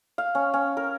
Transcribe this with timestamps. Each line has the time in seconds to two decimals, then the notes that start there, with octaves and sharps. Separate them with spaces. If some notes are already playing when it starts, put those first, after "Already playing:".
0.18 F5
0.35 C#4
0.54 C#4
0.77 A#4